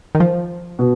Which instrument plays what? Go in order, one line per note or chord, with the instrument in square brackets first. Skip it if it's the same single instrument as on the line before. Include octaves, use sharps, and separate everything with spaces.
[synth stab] D#3
F3
[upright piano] B2